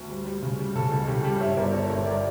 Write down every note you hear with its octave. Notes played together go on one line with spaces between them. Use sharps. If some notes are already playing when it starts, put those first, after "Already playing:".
Already playing: D2
G3
G3
C#3
G3
C#3 A4
C#2
C#3 G4
G3
G2 C#5 E5
G1 A#4 D5
G1 A4 C#5
G2 A4 C#5
G3 A#4 D5